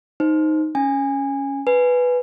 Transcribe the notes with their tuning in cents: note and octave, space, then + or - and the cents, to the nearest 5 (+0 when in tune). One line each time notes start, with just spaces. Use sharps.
D#4 +0 C5 +0
C#4 +0 G#5 -20
B4 +0 G#5 +0